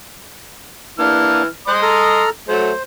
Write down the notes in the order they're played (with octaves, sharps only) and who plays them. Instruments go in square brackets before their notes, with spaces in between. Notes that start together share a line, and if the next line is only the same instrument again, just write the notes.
[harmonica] E3 F6 [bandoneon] A#3 D4
[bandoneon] C5 F#6 [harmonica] D#5 C6 D#6
[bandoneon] A4 A#5 F6
[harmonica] F#3 A3 [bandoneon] C5